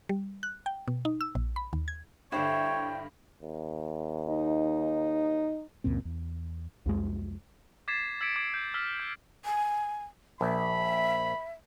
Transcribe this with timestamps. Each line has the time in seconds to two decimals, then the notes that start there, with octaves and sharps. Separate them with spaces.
0.09 G3
0.43 F#6
0.66 G5
0.88 B2
1.05 D#4
1.21 E6
1.35 A#1
1.56 B5
1.73 D#2
1.88 G#6
2.32 G2 D3 D4 E4 C5 C#5 G5
3.41 D#2
4.29 D#4
5.84 C#2 F#2 A#2 C4
6.05 E2
6.86 C2 F2 G#3
7.88 D6 G#6 A6 B6 C7 E7
8.21 E6 G#6 B6 C#7 D7
8.36 D6 G#6 B6 D7
8.54 G6
8.74 E6 F6 B6
9.00 G6
9.45 G#5
10.41 A#1 E5 B5